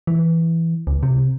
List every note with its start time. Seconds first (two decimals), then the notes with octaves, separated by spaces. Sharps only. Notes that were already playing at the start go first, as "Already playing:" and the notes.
0.07 E3
0.87 C#2
1.03 C3